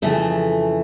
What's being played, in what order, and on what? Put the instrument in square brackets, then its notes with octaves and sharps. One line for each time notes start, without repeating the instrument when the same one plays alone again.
[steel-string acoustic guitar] F2 C#3 E3 A3